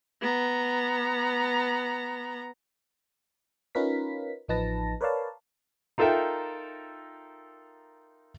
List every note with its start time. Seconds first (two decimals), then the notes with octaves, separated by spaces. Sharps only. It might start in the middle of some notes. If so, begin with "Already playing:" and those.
0.21 B3 A#5
3.75 C#4 D#4 F4 A#4 B4 B6
4.48 A1 F3 D#4 B4 A5 A#6
5.01 A#4 B4 C#5 D5 F5 A5
5.98 D#4 F4 A4 A#4 E5 G5